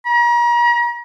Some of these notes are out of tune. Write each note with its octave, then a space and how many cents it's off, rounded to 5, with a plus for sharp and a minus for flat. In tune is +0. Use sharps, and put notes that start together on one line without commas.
A#5 +40